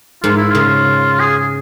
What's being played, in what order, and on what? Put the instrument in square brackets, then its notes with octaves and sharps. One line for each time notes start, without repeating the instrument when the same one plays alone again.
[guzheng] G#2 [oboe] F4
[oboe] E4
[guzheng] C#3 [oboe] F4
[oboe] G#4